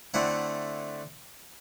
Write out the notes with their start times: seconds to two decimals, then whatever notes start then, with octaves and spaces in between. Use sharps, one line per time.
0.14 D3 A3 C4 E4 F#5